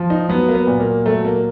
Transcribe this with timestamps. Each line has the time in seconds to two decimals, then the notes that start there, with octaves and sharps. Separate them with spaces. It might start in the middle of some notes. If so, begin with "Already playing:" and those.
Already playing: F3
0.10 D#4
0.29 F#3 B3
0.49 A#3
0.55 B3
0.67 A#2
0.80 A#3
1.06 F#3 A3
1.25 A#3